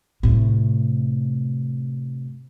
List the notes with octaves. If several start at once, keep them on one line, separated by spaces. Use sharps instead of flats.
A2 C3